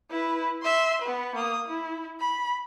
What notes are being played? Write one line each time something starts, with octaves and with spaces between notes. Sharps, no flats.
E4 B4
E5 C6
B3 B4
A#3 D#6
E4
B5